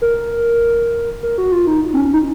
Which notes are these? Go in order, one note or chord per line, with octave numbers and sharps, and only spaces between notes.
A#4
A#4
F#4
F4
D#4
C4
C#4
D#4